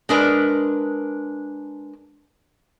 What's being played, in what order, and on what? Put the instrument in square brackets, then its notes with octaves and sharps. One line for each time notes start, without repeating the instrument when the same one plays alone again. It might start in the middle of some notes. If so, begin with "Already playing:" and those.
[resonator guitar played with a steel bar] G#3 D4 A#4 B4